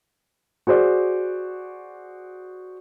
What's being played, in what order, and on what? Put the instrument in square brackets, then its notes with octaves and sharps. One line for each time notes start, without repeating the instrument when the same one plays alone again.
[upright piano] F#4 G#4 C5 D5